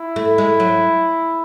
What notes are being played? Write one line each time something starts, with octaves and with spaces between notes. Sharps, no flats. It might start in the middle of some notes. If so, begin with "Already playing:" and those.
Already playing: E4
A3
G#3
F#3